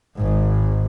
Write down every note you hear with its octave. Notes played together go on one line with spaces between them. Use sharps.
G#1 G#2